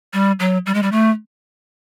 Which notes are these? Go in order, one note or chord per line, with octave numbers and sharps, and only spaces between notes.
G3
F#3
G3
G#3
G3
A3